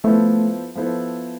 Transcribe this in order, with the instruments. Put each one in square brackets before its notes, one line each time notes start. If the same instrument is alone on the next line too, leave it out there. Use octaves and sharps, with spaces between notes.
[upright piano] F3 B3 E4 A4 C5 [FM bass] A3
[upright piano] F3 B3 E4 A4 C5